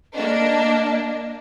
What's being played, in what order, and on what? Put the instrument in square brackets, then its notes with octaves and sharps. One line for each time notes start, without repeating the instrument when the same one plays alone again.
[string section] A#3 D4 [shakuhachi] D#5